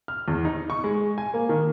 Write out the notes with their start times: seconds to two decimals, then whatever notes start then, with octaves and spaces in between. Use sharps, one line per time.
0.08 F6
0.28 E2
0.45 D#4
0.70 C#6
0.84 G#3
1.18 G#5
1.34 A#3
1.49 D#3